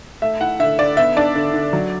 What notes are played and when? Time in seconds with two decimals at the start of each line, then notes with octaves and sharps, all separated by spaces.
0.22 A3 E5
0.41 E4 F#5
0.59 D3 E5
0.79 D3 D5
0.97 B3 E5
1.17 D4 D5
1.35 D3
1.54 D3
1.73 F#3